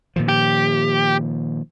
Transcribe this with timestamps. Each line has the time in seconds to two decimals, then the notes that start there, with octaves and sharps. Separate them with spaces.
0.16 A#2 D#3 F3
0.29 G4